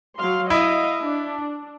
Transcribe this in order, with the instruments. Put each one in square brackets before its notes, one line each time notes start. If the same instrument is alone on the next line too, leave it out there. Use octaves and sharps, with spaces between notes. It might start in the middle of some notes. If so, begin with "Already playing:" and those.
[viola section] F#3 F5 C6
[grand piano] E4 [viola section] D#5 F5
[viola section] D4